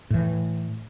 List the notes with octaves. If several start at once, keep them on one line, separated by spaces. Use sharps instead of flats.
A2 E3